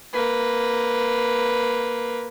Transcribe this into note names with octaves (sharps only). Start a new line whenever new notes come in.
A#3 B4